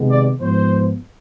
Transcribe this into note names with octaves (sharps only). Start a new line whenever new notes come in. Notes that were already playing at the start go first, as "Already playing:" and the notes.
Already playing: C3 D#3 G#3 B3
D5
G#2 F3 B3 C5